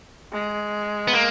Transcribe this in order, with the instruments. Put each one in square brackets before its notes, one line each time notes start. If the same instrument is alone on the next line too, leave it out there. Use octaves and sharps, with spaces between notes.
[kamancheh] G#3
[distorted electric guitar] B3
A#3